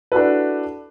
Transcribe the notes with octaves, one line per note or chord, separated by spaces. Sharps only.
D4 E4 F#4 A4 B4